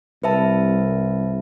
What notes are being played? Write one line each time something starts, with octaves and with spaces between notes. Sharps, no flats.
C2 B4 E5 A5